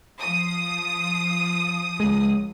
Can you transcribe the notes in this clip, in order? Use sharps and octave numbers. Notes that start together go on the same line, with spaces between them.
F3 D#6
C#2 G#3